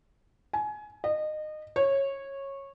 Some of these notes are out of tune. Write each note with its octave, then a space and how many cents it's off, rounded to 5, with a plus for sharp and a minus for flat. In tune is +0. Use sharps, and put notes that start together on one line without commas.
G#5 +25
D#5 -25
C#5 -15